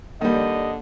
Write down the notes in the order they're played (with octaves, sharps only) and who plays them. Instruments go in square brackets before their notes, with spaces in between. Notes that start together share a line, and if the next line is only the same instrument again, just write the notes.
[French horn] D3 [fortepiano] D#3 G3 [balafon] A#3 [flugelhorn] D#5